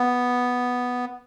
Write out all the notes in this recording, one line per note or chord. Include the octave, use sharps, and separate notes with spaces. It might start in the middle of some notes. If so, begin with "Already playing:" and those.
Already playing: B3